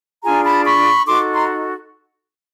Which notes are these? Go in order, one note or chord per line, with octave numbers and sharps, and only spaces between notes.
D4 F4 G#4 G#5 A#5
A5 B5
B5 C#6
D#4 F#4 A4 C6 D6
A#5 C6